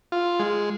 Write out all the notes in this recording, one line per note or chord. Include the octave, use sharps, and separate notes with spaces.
F4
G#3